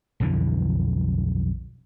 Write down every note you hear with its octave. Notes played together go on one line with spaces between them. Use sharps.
B1 F2 D3 E3